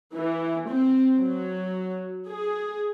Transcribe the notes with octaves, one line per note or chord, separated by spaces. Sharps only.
E3
C4
F#3
G#4